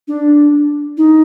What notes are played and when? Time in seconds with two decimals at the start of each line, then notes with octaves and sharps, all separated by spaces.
0.08 D4
0.97 D#4